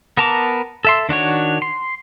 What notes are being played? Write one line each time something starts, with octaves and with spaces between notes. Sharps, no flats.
B3 A#4 A5 A#5 D6
A4 E5 C6
D#3 D4 F#4 C#5
C6